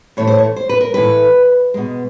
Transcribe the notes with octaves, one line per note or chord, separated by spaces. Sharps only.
A2 E3 A3 C#5
C5
C#5
C5
B4
A#4
A2 E3 A3 B4
B2 G#3